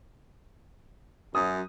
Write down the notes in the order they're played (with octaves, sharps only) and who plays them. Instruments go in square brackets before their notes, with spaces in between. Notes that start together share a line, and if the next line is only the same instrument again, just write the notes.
[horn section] F#2 [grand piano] D#6